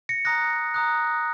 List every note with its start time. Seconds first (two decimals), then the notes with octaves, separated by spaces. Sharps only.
0.09 A#6 C#7
0.25 A#5 D#6 F#6 A#6
0.74 A#5 D#6 F#6